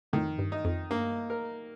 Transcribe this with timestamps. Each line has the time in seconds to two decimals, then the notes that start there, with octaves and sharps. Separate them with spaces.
0.13 F2 A2 D#3
0.39 G2
0.52 D#4
0.65 F2
0.90 G2 A#3
1.30 A#4